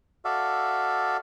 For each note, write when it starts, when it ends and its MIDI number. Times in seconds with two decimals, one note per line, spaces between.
0.25 1.17 66
0.25 1.17 69
0.25 1.17 74
0.25 1.17 76
0.25 1.17 77